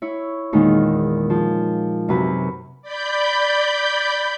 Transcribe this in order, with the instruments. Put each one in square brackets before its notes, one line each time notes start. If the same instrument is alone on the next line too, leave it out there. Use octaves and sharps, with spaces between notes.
[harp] E4 C#5
E2 A#2 D#3 G#3 D#4
F3
F#2 C3 B4
[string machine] D5 B5 G6